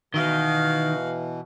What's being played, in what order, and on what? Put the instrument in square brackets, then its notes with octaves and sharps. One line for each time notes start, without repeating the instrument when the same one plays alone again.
[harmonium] B2 E3 [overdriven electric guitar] D#3 [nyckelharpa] F#4 F5